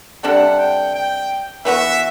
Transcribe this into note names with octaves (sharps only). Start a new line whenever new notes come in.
C3 G3 D4 A4 F#5
G5
G5
E3 B3 F#4 E5